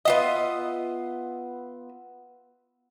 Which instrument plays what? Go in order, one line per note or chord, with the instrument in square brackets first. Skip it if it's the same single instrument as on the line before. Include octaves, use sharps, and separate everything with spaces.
[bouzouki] B3 F4 E5 [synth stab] D#5